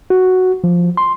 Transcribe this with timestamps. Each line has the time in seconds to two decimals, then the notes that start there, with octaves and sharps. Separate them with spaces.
0.10 F#4
0.64 F3
0.97 C6